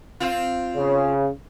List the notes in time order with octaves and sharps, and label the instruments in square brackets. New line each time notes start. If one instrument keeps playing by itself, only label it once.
[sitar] C4 F4
[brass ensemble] C#3